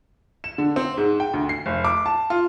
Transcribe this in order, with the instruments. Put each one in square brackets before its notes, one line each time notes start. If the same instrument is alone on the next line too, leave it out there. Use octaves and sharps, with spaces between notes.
[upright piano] E7
D3
C4
G#2
G5
D2
C7
F1
D6
A5
F4